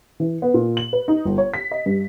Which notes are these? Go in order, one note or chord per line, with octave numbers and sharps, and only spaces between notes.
E3
B3
A#2
F#7
B4
D#4
G1
C#5
B6
D#5
G2